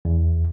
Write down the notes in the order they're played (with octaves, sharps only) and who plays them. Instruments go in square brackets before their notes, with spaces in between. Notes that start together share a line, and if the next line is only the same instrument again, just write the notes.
[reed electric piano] E2